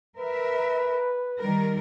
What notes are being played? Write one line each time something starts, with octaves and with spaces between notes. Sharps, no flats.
A#4 B4 E5
D#3 G3 A#4